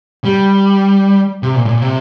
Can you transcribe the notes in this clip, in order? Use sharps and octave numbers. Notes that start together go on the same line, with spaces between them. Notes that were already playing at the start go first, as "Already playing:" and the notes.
G3
C3
A#2
A2
A#2
C3